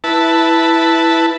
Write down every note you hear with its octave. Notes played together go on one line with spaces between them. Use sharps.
E4 B4 A5